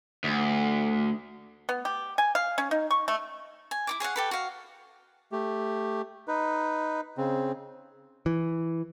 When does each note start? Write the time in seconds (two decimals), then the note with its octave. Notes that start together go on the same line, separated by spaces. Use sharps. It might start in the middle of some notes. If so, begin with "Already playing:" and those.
0.24 D2
1.69 B3
1.85 G4
2.18 G#5
2.35 F5
2.58 C#4
2.71 D#4
2.91 C#6
3.08 A3
3.71 G#5
3.87 E4 C#5 D6
4.00 G#4 C#5 F5 F#5
4.16 G4 A4 B4
4.31 F#4 F5
5.32 A3 G4
6.28 D#4 B4
7.17 C#3 C4
8.26 E3